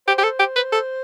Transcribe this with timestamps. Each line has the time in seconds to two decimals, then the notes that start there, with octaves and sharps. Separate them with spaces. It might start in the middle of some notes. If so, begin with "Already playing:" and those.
0.07 G4 C5
0.18 G4
0.23 A4
0.39 G4
0.56 B4
0.72 A4